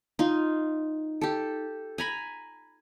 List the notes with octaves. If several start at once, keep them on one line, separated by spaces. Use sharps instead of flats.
D#4 F4
G4 A4
G#5 A#5 B5